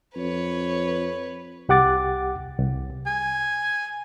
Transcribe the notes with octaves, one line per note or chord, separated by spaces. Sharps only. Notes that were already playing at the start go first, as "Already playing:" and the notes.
F2 B4 C#5
C2 G4 F#5 D6 A6
C2
G#5